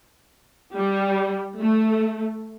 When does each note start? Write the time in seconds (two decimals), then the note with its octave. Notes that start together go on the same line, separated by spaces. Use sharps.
0.76 G3
1.59 A3